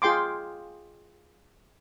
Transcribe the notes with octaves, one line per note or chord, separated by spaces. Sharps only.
F4 G#4 G5 C6 D6